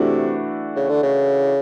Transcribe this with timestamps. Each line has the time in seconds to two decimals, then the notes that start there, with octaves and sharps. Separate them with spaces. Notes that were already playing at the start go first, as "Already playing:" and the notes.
Already playing: C3 E3 A3 D4 F#4
0.76 C#3
0.89 D3
1.02 C#3